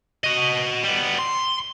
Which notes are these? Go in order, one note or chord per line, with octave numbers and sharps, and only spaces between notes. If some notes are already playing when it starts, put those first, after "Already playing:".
F#4 D#5
G3 B3
C6